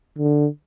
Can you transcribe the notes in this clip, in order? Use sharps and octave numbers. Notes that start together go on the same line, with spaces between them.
D3